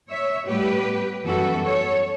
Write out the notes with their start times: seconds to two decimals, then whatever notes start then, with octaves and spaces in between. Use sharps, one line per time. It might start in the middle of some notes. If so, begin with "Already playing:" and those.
0.10 C#5 E5
0.48 A2 G3 B3 G4 B4
1.25 F#2 E3 G3 B3 F#4 A4
1.64 A4 C#5